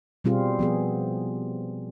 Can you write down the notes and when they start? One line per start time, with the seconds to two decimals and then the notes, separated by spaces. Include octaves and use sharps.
0.24 B2 G3 C4 F4 G#4
0.59 F3 B3 G#4